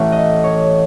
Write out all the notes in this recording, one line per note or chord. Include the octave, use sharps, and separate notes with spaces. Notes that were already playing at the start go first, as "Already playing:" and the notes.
Already playing: A1 A2 E3 A3 F#5
D#5
C#5